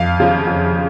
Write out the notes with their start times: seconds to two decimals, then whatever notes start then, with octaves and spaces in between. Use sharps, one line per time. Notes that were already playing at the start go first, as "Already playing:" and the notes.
Already playing: F2 F5
0.20 C#3 F3
0.47 F2